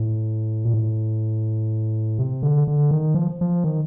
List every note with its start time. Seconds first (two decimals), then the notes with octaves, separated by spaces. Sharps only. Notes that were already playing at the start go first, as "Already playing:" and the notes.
Already playing: A2
0.65 A#2
0.74 A2
2.19 C3
2.43 D3
2.67 D3
2.91 D#3
3.14 F3
3.41 F3
3.64 D#3